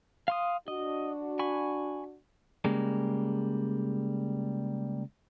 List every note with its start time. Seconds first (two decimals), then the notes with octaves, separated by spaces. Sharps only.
0.28 F5 C6 D#6
0.68 D4 F#4 D#5
1.39 G#5 B5 C#6
2.64 C#3 G3 G#3 A#3